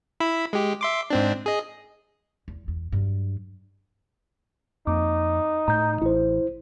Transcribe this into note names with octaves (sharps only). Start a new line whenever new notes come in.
E4 B5 E6
G#3 G4
E5 C6 D6
G#2 C4 D4
G#4 D#5
E2
E2
G2 F#3
F2 A#3 D#4 D6
A2 A#5 G6
A1 E4 C5